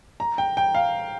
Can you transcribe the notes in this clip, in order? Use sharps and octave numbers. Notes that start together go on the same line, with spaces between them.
A#5
G5
G5
F5